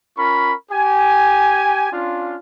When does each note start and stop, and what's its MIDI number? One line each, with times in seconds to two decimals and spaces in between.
0.16 0.53 61
0.16 0.53 65
0.16 0.53 70
0.16 0.53 83
0.16 0.53 85
0.71 1.91 67
0.71 1.91 80
1.92 2.37 61
1.92 2.37 62
1.92 2.37 65